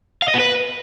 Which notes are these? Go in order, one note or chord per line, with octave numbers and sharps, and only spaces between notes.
F5
D#5
B3
B4